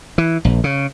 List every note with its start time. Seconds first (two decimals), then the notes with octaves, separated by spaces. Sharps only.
0.18 E3
0.45 A#1
0.64 C#3